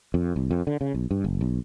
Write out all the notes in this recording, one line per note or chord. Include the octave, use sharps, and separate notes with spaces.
F2
C2
F2
D3
C#3
B1
G2
F#1
B1